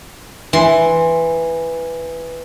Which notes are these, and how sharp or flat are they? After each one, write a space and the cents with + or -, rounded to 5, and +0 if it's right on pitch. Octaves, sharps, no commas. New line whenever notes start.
E3 +0 C6 +0